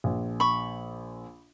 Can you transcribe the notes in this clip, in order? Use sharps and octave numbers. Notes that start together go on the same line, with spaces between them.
A#1
B5 C#6